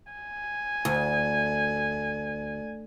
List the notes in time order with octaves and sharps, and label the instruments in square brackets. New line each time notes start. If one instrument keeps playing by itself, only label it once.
[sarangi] G#5
[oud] D2